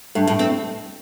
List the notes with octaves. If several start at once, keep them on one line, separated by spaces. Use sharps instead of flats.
G2 A3
A2
C4